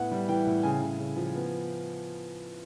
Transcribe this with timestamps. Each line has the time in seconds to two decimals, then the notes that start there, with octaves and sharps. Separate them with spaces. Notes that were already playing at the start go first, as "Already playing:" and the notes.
Already playing: A2 B3 F#5
0.11 G3
0.29 E3 G5
0.46 A2
0.63 C#3 G#5
0.82 C#3
0.99 C#3
1.16 F3
1.35 B3